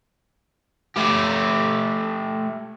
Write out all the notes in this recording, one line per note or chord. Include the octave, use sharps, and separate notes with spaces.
A3 G4